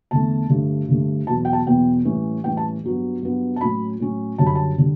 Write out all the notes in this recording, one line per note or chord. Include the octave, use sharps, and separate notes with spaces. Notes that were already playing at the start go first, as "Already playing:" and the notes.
E2 D3 A3 A5
G2 D3 A3
G2 D3 A3
E2 B2 F#3 A5
G5
A5
E2 B2 F#3 G5
A2 E3 G3 C#4
A2 E3 G3 C#4 G5
A5
G2 F#3 B3
G2 F#3 B3
A5
A2 F#3 C#4 B5
A2 F#3 C#4
F#2 D3 G3 A5
B5
A5
D3 G3